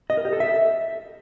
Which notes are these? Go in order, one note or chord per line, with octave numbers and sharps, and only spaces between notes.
D#5
A#4
G4
A4
E5